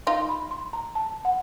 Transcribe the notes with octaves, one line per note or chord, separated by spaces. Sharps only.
D#4 F4 C6
C6
B5
C6
A#5
A5
F#5